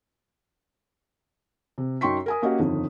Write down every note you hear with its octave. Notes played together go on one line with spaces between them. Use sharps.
C3
F#2 D#4 G5 C6 C#6 B6
A#4 G#5 D#6
A#3 C#4 F#4 G4 D#5 F#5
G1 F2 D#3